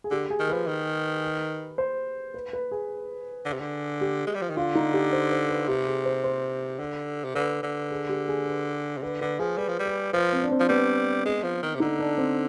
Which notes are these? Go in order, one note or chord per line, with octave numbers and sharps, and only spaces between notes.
G#4
D3 G4
G#4
D#3
F3 B4
D#3
C5
B4
B4
G#4
D3
C3
D3
G4
G#3
G3
F3
D#3
D3 F4
D#4
G4
C5
C5
B4
C3 G4
G#4
C5
C5
D3
C3
D3 B4
D3
G#4
G4
G#4
B4
C3
D3 B4
D3 B4
F3 G#4
G3 B4
F3
G3
B4
F3 B4
C4
D4
C4
F3
G3 B3
G#3
F3
D#3
C3
D3 D#4
D4
C4